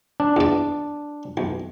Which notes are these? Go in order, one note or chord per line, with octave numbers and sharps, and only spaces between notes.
D4
E2 D5
B1